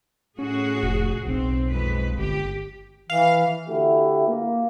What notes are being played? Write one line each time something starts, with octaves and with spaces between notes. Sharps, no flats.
A2 C#4 F#4 G#4
F1
B1 C4
F2 G#3 B4
G1 G4
E3 F5
D3 A3 E4 F#4 G4
A#3